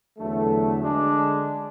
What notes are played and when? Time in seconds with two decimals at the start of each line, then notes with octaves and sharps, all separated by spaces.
0.18 E2 D3 F#3 A3
0.80 D3 G#3 D4